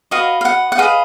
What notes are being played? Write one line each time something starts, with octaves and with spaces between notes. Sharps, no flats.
F#4 B4 D#5 F5
F5
F#5
F#5
G#4 B4 D#5 F5